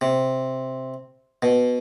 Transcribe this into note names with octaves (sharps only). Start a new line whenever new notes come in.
C3
B2